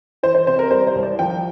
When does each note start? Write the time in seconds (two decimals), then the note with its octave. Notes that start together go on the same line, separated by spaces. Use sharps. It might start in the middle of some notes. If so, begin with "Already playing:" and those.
0.23 E3 C5
0.35 C5
0.47 C3 C5
0.59 A#4
0.71 G3 C5
0.87 C5
0.95 C2
1.03 D5
1.19 F3 G5